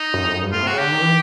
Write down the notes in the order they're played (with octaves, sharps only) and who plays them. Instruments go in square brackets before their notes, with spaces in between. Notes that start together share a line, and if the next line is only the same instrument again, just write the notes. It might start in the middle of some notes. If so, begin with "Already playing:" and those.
Already playing: [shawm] D#4
[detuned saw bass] F#2
F2
F#2
G2
[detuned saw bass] A2 [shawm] F4
[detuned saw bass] C3
[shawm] F#4
[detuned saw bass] C#3
[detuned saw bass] D3 [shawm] G4
[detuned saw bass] D#3
E3